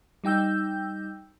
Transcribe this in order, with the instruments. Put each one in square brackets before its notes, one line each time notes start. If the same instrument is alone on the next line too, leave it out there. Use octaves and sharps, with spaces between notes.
[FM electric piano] G3 D#4 G5 E6 G6